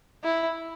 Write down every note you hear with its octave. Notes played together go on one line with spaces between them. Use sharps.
E4